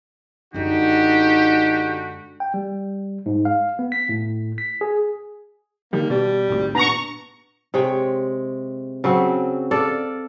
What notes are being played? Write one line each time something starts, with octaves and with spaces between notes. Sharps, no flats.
F#2 D3 G#3 D#4 F#4 G4
G5
G3
G#2
F5
B3
B6
A2
B6
G#4
D3 D#3 G3 A#3
B2 G3
G#1 D2
A#2 B3 D4 A#5 C#6
C3 G#3 C#5 G5
C#3 F#3 C4
A4 D5 F5